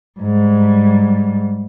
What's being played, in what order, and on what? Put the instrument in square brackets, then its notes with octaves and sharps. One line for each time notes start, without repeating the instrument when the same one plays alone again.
[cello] G#2 G3